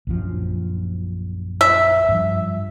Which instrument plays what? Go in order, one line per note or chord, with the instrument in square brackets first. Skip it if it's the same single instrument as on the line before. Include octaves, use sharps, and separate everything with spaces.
[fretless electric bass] A#1 F#2 F3
[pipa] E5
[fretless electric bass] G2 F3